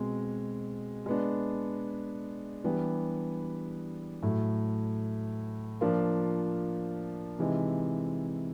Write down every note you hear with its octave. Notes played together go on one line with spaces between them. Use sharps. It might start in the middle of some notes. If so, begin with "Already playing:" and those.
Already playing: B2 G#3 C4
G#3 B3 D4
E3 G3 B3 D4 G4
A2 F#3 A3
F3 A#3 D4 F4
C3 E3 G#3 C4 D#4